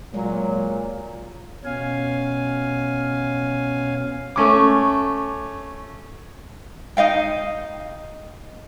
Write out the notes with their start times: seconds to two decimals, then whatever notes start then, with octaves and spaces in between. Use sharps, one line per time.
0.14 A#2 F#3 G#3
1.65 B2 C#4 F5 G#5
4.36 A3 C#4 D6
6.97 D#4 D#5 F5 G5